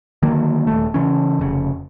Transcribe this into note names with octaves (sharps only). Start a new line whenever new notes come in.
D3 D#3 F#3 A#3
D#1 A#1 A3
C#3 E3 C#4
F1 C#3